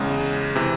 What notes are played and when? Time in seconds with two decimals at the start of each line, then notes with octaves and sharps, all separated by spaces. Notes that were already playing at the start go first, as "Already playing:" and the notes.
Already playing: E2 C#3 G#3
0.56 C3 E3